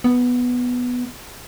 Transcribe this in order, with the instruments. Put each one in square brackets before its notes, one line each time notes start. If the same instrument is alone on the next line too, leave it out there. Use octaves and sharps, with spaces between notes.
[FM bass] B3